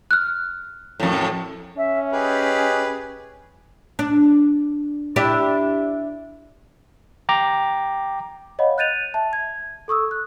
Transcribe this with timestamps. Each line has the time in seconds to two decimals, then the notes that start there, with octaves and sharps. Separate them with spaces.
0.11 F6 F#6
1.00 F2 A2
1.77 C#4 E5
2.13 G4 G#4 B4 D#5
3.99 D4
5.16 D4 E4 G4
7.29 G5 A#5 D6
8.59 C#5 D#5 F5 F#5 B5
8.78 F#6 G6 A6 D#7 F7
9.14 E5 A5
9.33 G#6
9.88 A4 C#6 D#6 E6
10.11 F#6